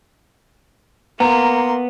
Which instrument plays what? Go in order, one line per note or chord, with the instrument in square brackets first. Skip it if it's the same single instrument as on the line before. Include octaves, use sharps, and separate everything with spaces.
[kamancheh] A#3 C6 [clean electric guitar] B3 [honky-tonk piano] A#5